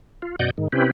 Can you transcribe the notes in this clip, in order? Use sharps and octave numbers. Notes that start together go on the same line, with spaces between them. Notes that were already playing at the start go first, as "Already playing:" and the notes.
F4
F#2 B2 D5 D#5 F#5 G6
G#2 D#3
C3 C4 C#4 E4 G4 B4